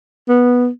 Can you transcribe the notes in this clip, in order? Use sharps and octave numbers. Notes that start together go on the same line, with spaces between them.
B3